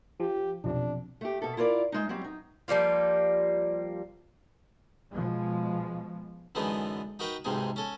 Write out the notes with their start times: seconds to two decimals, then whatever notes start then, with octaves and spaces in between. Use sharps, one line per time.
0.20 F3 G4
0.64 B1 F2 C3 D4
1.21 A3 G4
1.42 B2 A4
1.57 E4 F4 A#4 C#5 D5
1.92 G#3 D#4
2.09 F#3 G3 C4
2.24 D#4
2.68 F3 G3 A#3 F4
5.12 B2 F3 G#3
6.55 F#2 D3 E3 G#3 B3 D#4
7.19 D#4 F#4 A#4 B4 G5
7.44 B1 G#2 C3 G#3 D#4 G#5
7.76 C#4 A4 G#5